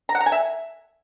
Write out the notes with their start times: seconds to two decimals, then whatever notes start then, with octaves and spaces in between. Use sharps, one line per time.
0.09 A#5
0.15 F#5
0.20 A#5
0.26 G#5
0.32 E5